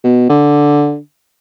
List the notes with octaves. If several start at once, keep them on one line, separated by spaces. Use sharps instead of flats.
B2
D3